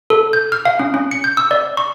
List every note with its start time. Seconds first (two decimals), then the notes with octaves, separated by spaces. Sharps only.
0.10 A4
0.33 G6
0.52 F6
0.65 F5
0.79 C#4
0.94 C#4
1.11 C#7
1.24 G6
1.37 E6
1.51 D5
1.77 C#6